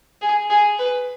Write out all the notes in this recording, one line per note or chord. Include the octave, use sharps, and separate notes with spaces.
G#4
G#4
B4